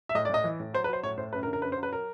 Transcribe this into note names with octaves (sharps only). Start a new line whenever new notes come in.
E5
A2 D#5
D5
A2 D#5
E3
A2
F#3 C5
B4
F#3 C5
A2 C#5
A2 C5
F#2 B4
A#4
D3
A#4
F#2 B4
C5
F#3
B4
A#4